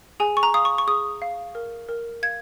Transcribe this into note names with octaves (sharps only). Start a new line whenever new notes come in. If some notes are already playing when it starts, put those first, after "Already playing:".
G#4 G#5
C#6
A#5
F5 D#6
C#6
C#6
G#4 D#6
F5
A#4
A#4
F5 G#6